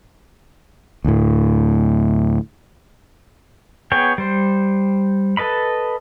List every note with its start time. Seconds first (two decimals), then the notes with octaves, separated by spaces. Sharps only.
1.05 D2 A2
3.92 B3 G#4 C#5 G5
4.18 G3 C5
5.37 A4 B4 D#5 B5